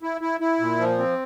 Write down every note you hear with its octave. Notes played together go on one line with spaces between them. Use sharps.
E4
E4
E4
A#2
F3
C4